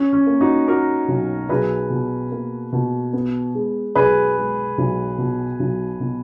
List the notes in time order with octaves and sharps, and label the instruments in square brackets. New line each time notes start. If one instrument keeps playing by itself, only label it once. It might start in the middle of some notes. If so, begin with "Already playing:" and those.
Already playing: [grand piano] C#4
C#4
[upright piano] A#3
[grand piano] D#4 F#4
[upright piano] A#3 [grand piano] F#4 A#4
[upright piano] B1
[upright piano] B1 [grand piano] G#4 B4
[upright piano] B2
A#3
B2
B3
G#3
[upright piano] B1 [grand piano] G#4 B4
[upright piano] G#3
B1
B2
B1
B2